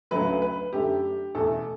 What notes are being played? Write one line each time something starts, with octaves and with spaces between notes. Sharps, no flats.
D2 C#3 F#3 A3 B4
B4
F#2 D3 A3 G4
E2 B2 A3 A4